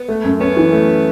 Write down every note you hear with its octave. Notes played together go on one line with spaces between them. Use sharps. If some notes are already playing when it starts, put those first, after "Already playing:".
Already playing: B3
A3
F#2
B3 C#4
E3
A3